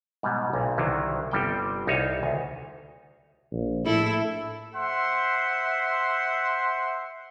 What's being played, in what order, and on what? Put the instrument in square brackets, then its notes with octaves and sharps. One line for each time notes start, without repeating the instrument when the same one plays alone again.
[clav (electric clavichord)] G#2 B2 F#3 G3
B1 A#2
C2 D3 D#3 F#3
G1 C3 G3 C4 A4 G5
C2 D#4 F4 C#5 A5
D2
[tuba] A#1
[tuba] A2 [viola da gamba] E4 A4
[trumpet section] C5 E5 F#5 C6